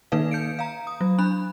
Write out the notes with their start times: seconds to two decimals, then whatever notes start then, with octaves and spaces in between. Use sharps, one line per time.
0.12 D#3 A#3 D#4 B4 F5
0.31 G6 C#7 D7
0.59 F5 A#5
0.87 D#6
1.01 F#3
1.19 D4 B5 F#6